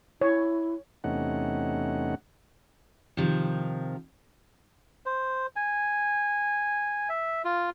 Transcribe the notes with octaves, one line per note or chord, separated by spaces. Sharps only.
E4 C#5
E2 C3 A3 C#4 D#4 F#5
C3 D#3 F3
C5
G#5
E5
F4